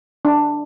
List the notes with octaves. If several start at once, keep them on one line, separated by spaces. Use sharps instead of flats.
D4